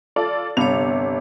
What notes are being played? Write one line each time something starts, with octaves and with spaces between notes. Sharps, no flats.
F4 A4 D5
G1 C3 B3 C#5 F7